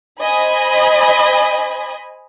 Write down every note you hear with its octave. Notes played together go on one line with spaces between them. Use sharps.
C5 D#5 G#5 B5